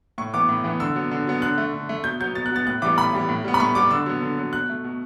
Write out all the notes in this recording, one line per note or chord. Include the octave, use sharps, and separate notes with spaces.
A2 C#6
E3 B3 D6
A2
E3 B3
D3 E6
F#3 B3
D3
F#3 B3
D3 F#6
A3
D3
A3
B2 G6
F#3 B3 G6
B2 A6
F#6
F#3 B3 A6
A2 F#6
E3 G3 B3 D6
A2 B5
E3 G3 B3
A2
G3 B3
B5
A2 C#6
G3 B3 D6
D3 E6
F#3 B3
D3
F#3 B3
B2 F#6
A3
B2